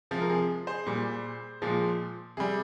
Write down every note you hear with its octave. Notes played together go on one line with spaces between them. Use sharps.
C3 F3 G#3
A#4
G#4
G#4 C5
A#2 G3
A#2 F3 G#3
C3 G3 G#4